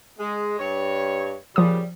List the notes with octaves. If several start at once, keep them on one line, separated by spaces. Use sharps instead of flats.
G#3
G2 C#5
A#2 C#3 F3 G3 D#6